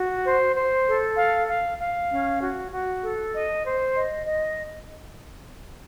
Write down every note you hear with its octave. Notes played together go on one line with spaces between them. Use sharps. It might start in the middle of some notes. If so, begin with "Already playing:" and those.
Already playing: F#4
C5
C5
A4
F5
F5
F5
C#4
F#4
F#4
A4
D#5
C5
D#5
D#5